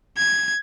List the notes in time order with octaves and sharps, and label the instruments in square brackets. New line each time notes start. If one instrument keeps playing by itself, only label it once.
[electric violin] G#6